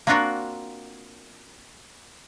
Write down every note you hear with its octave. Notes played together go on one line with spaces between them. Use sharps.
A#3 C4 D4 F4 F#4 A#4